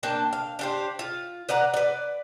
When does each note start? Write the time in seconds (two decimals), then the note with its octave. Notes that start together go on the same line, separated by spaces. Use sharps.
0.03 A#3 D4 G5 A5
0.33 F5
0.59 D4 G4 C5
0.99 F4
1.49 B4 D5 F#5 A#5
1.74 B4 D5